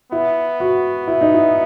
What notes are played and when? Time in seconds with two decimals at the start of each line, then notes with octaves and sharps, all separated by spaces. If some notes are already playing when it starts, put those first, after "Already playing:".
0.12 B3 E4
0.60 F#4
1.08 E4
1.21 D#4
1.34 E4